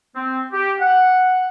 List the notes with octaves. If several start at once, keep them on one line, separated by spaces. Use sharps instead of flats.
C4
G4
F#5